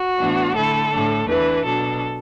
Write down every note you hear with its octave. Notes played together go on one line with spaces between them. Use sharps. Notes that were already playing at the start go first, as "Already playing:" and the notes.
Already playing: F#4
A2 E3 B3 D4
D3 A3 E4 A4
A2 A3 D4
E2 E3 D4 B4
B2 F#3 D4 A4